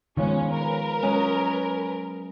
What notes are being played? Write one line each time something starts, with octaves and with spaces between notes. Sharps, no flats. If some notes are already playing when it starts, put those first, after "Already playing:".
D#3 F3 G#3 B3 C#4
A#4 B4
F#3 G#3 C#4 D#5